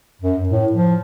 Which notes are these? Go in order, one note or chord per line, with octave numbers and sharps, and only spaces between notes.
F#2
A2
F3